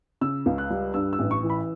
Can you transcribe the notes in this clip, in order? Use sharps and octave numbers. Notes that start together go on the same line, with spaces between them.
C#3 E6
C#2
F#6
G3
G2 E6
E6
A1
C#6
E3
B5